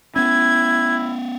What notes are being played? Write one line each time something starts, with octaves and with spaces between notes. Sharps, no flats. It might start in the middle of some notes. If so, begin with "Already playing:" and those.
B3 C#4 E4 G#6